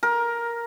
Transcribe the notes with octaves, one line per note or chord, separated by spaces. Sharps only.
A#4